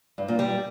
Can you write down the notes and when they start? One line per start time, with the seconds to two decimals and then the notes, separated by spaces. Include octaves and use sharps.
0.18 G2
0.28 A#2
0.39 G3